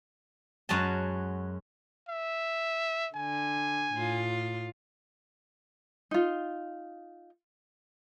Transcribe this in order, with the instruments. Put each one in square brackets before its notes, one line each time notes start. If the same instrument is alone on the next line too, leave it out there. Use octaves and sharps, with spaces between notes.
[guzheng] F#2 G#3 C#4 F#4 A5
[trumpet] E5
[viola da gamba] D3 [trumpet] G#5
[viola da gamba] A2 F4
[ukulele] D#4 F4